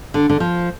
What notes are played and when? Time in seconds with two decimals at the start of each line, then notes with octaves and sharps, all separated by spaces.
0.14 D3
0.29 D3
0.40 F3